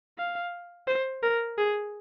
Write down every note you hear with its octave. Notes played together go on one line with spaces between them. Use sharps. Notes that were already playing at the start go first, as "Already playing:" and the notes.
F5
C5
A#4
G#4